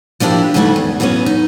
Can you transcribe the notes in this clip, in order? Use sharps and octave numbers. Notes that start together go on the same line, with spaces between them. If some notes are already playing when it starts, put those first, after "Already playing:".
F3 A#3 D4 E4 G4
G#2 C#3 E3 F#3 G3 A3
E2
E3 F#3 A#3 B3 C#4
D#4